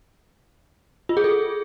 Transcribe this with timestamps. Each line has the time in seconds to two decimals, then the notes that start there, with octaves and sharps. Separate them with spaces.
1.09 F4
1.17 G#4
1.24 A4